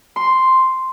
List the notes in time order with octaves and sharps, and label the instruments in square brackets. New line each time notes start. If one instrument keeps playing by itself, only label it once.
[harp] C6